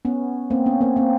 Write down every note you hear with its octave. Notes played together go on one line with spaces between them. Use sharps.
B3 C#4
A#3 C4
B3 C#4
A#3 C4
A#3 C4